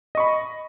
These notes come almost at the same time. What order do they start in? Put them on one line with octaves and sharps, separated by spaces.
D#5 C#6 B5